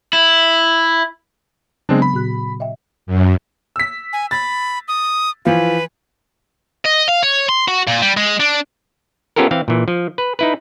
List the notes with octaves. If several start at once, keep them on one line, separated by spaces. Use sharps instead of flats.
E4
C#3 F#3 G#3 B3 C4 D4
B5
A#2 F#4 F#6
D#5 E5 G5
F#2
E6 B6
G#5
B5 A6
D#6
E3 F3 F4 B4
D#5
F5
C#5
C6
F#4
A#2
G3
G#3
D4
B3 C#4 F4 G4 A4 A#4
E3 C4 F5
A#2 E3
F3
B4
D#4 E4 B4